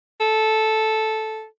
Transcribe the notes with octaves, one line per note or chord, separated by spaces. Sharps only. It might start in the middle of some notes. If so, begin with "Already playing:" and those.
A4